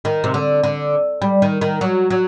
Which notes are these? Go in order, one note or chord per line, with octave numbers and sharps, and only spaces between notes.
D#3
C3
D3
D3
G3
D#3
D#3
F#3
F#3